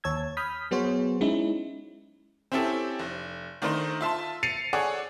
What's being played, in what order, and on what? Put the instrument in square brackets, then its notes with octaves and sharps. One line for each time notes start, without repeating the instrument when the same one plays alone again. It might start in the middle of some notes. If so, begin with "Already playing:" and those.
[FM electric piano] D#2 C#5 A5 E6 G#6
B5 D#6 F6 G6 B6
F#3 B3 F#4 G#4 C5 C#5
G#3 C#4 D#4 E4
[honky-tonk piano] C4 C#4 E4 G4 A4
F1
D#3 A3 D4 D#4 A#4 C5
F4 E5 A5 C6
A6 C7 C#7 D#7 F7
G#4 A4 C#5 D5 F#5